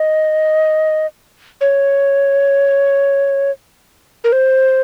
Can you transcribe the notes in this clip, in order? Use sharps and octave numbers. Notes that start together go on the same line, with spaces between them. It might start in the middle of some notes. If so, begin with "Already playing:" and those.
Already playing: D#5
C#5
A#4
C5